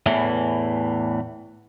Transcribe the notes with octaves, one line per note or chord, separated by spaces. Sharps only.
E2 A2 E3